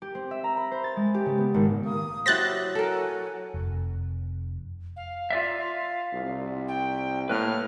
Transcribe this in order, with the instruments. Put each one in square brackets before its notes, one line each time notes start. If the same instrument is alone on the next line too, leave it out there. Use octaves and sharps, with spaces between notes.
[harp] G4
C4
E5
A#5
B5
C5
A6
G#3
G4
C#3
B3
G#1
[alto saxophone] A#3 [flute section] D#6
[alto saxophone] F#3 [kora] E4 C5 [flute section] G4 [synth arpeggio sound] F#6 A6 A#6
[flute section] F#4 G#5 [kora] A4 A#4
[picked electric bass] F1
[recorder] F5
[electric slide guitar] F4 D5 E5
[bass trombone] C2
[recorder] G5
[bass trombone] A2 [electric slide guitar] A#3 B4 [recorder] F6